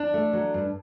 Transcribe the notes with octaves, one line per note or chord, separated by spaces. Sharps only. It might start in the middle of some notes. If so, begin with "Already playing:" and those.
Already playing: D4
A3
F#3
G2